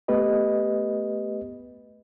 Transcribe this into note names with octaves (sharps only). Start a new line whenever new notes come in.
A3 B3 G4 B4 D#5